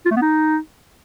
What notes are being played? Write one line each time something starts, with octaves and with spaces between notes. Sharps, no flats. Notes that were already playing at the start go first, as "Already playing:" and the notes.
F4
A3
B3
D#4